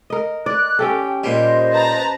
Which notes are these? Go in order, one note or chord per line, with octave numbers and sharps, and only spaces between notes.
A#4 D#5
D5 F#6
C#4 G4 A4 G5
A#2 G3 C5 D#5
B4 A5 A#5